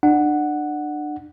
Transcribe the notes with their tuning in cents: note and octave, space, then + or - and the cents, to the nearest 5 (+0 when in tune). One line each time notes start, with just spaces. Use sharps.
D4 +30 F#5 +0